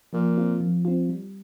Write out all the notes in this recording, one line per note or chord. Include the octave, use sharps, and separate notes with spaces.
A#2 F3
C4 F4
F3
C4 F4
G3